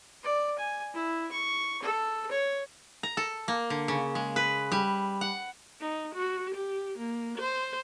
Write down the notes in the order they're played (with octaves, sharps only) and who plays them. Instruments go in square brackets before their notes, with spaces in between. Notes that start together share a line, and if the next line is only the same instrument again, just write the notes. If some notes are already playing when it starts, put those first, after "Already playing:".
[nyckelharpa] D5
G#5
E4
C#6
A4
C#5
[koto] A#5
A4
A#3
D3
C#3
G#3
B4
G3
F#5
[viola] D#4
F#4
G4
A#3
C5